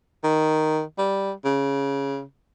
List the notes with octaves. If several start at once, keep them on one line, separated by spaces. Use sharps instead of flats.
D#3
G3
C#3